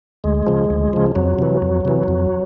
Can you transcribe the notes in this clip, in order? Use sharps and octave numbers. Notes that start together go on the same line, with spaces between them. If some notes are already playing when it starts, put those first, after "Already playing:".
D2 G#3
C#3 F3
D2
C#3 F3
F2 F#3
C3 E3
F2
C3 E3
F2